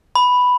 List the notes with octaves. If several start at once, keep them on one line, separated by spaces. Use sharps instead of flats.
B5